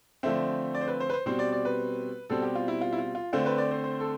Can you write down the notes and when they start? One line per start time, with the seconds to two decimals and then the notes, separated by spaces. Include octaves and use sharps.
0.23 D3 F3 A3 C4 E5
0.75 D5
0.81 C5
0.88 B4
1.00 C5
1.10 B4
1.13 C5
1.26 B2 G3 C4 C5
1.39 D5
1.53 D5
1.65 B4
2.29 B2 G3 C4 A4
2.42 G4
2.55 F4
2.68 E4
2.81 F4
2.93 E4
2.98 F4
3.15 F4
3.33 D3 A3 C4 F4
3.46 B4
3.58 D5
3.71 C5
3.84 C5
4.00 A4